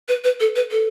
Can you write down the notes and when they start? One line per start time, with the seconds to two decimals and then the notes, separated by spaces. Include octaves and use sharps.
0.08 B4
0.24 B4
0.40 A4
0.56 B4
0.71 A4